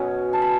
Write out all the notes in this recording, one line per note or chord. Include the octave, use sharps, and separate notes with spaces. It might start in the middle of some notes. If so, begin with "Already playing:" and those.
Already playing: B2 F#3 C#4 B4 D#5
A5
B5